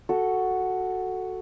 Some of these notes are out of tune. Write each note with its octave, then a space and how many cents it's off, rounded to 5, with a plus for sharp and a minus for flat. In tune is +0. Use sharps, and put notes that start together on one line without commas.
F#4 +0 A4 +0